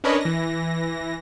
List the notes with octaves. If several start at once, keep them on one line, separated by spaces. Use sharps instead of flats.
C#4 D4 A#4 B4 C#5 D#5
E3 A#6